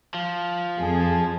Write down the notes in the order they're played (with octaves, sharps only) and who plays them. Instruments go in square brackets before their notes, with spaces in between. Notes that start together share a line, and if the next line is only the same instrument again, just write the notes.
[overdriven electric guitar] F3
[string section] F2 G#4